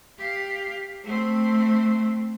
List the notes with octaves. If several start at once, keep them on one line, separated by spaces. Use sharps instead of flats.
G4 F5
A3 C4